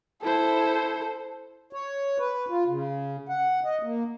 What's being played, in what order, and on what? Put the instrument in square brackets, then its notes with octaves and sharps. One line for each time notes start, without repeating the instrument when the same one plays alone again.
[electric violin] E4 C5 [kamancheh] A4
[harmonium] C#5
B4
F4
C#3
F#5
D#5
A#3